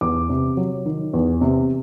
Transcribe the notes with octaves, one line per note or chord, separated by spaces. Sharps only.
E2 D6
C3
F#3
D#3
E2
C3